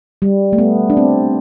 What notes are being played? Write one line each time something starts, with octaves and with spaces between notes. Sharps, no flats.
G3
A3
B3
D4
C4